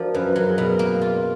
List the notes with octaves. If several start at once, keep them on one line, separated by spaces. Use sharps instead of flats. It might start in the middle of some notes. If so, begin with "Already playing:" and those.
Already playing: F3 D4 F#4 A#4
F#2 B4
F#3 A#4
G#4
B2
A#4
A#3
F4